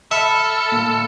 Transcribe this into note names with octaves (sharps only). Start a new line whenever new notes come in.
A4 E5 B5 F6 C#7
A#2